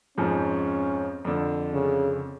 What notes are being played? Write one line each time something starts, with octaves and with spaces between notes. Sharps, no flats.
F2 G#2 F3 C#4
F2 D3
C#3